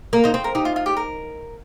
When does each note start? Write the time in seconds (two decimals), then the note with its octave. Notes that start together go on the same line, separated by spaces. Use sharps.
0.13 A#3 A#4
0.24 D#4 C5
0.34 C4 C5
0.44 A#4
0.55 D#4 G4
0.65 F4
0.76 F4
0.86 G4
0.96 A#4